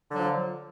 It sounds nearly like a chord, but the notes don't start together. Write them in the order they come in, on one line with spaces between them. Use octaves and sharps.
D3 F#3 F3